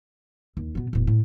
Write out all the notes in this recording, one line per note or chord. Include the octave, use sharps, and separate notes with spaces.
D#2
B2 B3
E1 A2
A2